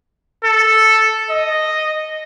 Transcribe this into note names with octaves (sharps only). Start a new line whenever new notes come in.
A4
D#5